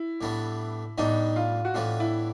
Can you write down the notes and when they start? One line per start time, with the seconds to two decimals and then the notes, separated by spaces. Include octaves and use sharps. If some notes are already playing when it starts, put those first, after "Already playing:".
Already playing: E4
0.21 A2 E3 G3 B3 D4
0.98 A2 E3 G3 B3 D4 D#4
1.36 F4
1.65 F#4
1.74 A2 E3 G3 B3 D4 F4
2.00 E4